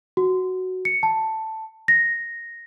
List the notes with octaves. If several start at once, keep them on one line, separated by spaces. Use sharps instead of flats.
F#4
C#7
A5
A#6